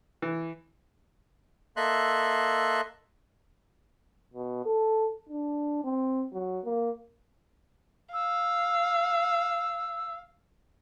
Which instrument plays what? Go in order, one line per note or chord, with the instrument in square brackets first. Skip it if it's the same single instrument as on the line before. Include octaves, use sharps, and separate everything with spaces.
[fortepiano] E3
[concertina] A#3 A4 D#5 E5 C6 F#6
[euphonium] B2
A4
D4
C4
F#3
A#3
[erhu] F5 [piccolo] E6